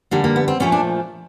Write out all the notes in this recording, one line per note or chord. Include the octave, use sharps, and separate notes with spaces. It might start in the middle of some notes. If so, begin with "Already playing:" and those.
D3 G3 A#3
A#3
B3
C4
A#2 F3 A3 C#4
D4